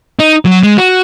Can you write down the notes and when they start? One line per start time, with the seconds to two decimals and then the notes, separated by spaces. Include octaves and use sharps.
0.19 D#4
0.45 F#3 F#4
0.63 G#3
0.77 F#4